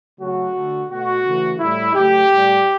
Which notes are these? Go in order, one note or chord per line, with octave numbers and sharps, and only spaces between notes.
C#3 F#3 A3 F#4
D3 A3
B2 A3 F#4
C#3 E3 A3
A2 G3 E4
C#3 F#3 A3 G4
A2 G3